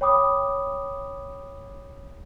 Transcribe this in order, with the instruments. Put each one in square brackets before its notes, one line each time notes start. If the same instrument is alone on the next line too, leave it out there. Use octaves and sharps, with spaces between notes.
[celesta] C#5 G5 B5 D6 D#6